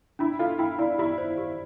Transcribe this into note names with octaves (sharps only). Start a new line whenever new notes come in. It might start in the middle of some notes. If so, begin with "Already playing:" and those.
D4 E4
F4 A4
E4 G5
E4 D5
E4 G4
C5
G4